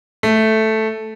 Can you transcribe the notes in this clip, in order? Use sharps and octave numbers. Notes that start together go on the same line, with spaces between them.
A3